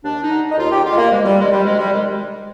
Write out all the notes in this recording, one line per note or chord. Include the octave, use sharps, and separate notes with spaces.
D#2 D4
D#4
D3
D#4
D#2 F4
G4
D3 F4
G#3
A#3
D2 G#3
G3
C3 D#3 G#3
G3
D2 G#3
G3
C3 D#3 G#3